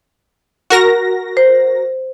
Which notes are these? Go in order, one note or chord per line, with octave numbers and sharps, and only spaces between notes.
F#4 A#4 A#6
C5